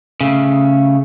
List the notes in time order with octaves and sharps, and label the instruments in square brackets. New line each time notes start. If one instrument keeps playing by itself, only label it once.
[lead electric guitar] C#3 A3